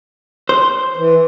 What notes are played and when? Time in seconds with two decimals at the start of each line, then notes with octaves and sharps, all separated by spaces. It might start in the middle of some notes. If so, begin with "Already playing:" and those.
0.49 C5
0.96 E3